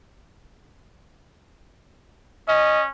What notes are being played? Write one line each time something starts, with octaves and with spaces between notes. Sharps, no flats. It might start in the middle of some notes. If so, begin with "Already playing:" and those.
C#4 D#5